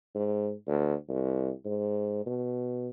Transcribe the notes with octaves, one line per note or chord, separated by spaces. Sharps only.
G#2
D2
C2
G#2
B2